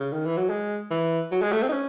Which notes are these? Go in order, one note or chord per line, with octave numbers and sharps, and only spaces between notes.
C#3
D#3
E3
F#3
G#3
E3
F#3
G#3
A3
C4
D#4
C#4